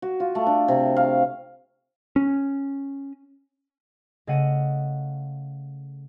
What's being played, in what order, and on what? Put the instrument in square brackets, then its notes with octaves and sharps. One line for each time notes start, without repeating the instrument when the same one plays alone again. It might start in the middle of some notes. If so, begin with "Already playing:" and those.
[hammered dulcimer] F#4
F4
A3
D4
C3
F5
[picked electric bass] C#4
[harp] C#3 A3 D#5 F#5 D#7